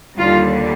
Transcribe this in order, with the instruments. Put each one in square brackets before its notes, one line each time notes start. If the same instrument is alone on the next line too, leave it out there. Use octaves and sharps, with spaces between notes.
[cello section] D#2 D3 G3 F4